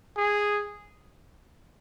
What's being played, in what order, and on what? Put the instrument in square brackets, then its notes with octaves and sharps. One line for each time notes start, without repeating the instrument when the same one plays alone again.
[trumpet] G#4